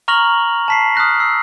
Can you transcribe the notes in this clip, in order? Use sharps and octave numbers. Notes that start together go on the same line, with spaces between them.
A#5 C#6 F6 A#6 F7 F#7
A5 B6 C7
D#6 F6 F#6 A#6
E6 C7